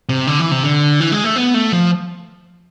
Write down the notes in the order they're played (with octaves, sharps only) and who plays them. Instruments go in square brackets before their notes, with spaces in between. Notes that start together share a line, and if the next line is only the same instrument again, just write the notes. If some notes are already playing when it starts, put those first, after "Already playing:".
[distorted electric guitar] C3
D3
E3
C3
D3
E3
G#3
A3
B3
A3
F3